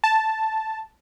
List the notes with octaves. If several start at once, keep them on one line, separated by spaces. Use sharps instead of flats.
A5